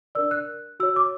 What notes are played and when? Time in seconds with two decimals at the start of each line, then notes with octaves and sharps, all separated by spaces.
0.15 D4 A#4 D5 E6
0.31 F#6
0.80 F#4 C#5 E6
0.96 D6